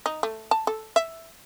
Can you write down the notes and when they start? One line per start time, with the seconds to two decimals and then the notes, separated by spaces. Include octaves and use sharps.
0.06 D#4
0.23 A3
0.51 A5
0.67 A4
0.96 E5